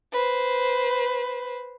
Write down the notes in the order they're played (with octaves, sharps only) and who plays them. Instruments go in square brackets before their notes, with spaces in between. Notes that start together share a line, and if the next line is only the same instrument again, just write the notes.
[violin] B4 C5